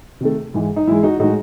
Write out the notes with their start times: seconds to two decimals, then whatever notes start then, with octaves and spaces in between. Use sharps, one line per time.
0.21 C3 D#3 A3
0.54 G#2 E3 G#3
0.76 D#4
0.87 G#2 E3 G#3 E4
1.03 D#4 F#4
1.19 A2 G#3 D#4 F#4